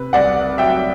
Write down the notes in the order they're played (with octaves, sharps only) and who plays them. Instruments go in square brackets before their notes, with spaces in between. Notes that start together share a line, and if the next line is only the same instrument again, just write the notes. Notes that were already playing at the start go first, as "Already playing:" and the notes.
Already playing: [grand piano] C3 B4
C2 D5 F#5
F#3 E5 G5